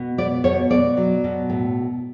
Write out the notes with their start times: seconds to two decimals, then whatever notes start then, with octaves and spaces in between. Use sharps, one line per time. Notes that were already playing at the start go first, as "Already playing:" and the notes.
Already playing: B2
0.18 B3 D5
0.44 B2 C#5
0.71 B2 D5
0.97 F#3
1.24 B2
1.50 A2